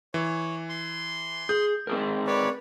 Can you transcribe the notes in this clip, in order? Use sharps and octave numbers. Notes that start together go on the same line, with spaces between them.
E3 C#5
C6
G#4 G6
C4 G#4 A#4
B4 C#5 D5